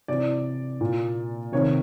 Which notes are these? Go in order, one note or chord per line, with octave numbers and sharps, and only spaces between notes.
C3 E3 D5
A#2
C3 D#3 C#5